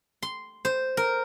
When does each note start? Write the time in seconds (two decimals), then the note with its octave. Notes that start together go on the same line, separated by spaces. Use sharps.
0.23 C6
0.65 C5
0.97 A#4